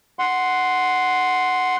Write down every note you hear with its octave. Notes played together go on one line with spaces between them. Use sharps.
F#5 C6